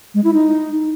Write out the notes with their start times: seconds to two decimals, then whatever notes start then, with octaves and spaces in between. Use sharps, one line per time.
0.14 G#3
0.24 E4
0.34 D#4